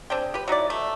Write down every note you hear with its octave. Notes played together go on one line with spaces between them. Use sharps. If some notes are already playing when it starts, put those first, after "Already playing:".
C4 D4 G#4 G5
G4 B4
F#3 D#4 E4 D5
A3